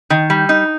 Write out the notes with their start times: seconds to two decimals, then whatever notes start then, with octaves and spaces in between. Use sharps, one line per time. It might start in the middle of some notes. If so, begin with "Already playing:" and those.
0.10 D#3
0.30 G3
0.49 D#4